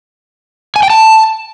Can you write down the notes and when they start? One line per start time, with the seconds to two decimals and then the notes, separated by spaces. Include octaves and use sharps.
0.76 G#5
0.83 G5
0.90 A5